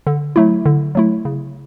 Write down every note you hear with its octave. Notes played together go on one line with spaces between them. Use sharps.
D3
F#3 A3 E4
D3
F#3 A3 E4
C#3